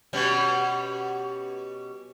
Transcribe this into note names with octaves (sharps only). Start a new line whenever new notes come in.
B2 G3 C#4